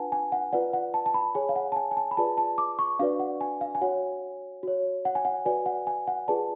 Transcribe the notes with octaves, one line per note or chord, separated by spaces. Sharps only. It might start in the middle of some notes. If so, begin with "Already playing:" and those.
Already playing: D4 F4 B4 F#5 G#5 A5
G#5
F#5
F4 B4 D5 F#5
F#5
A5
A5
B5
G#4 C#5 G#5
F5
F#5
A5
G#5
G#5
A5
B5
F4 G#4 B4 D5 A5
A5
D6
C#6
D4 F#4 B4 D5 F5
F#5
G#5
F5
G#5
F#4 C#5 F#5
F#4 C#5
F#5
G#5
F#5
F#4 B4 D5 G#5
F#5
G#5
F#5
F4 G#4 B4 D5 A5